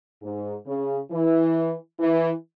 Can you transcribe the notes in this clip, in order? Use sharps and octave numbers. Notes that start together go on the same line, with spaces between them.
G#2
C#3
E3
E3